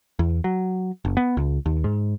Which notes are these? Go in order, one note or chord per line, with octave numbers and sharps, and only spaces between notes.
E2
F#3
F#1
B3
C#2
D#2
G#2